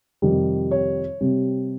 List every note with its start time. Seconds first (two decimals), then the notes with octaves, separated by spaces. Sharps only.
0.22 F2 C3 D#3 G3
0.71 C#5
1.21 C3 G3 C4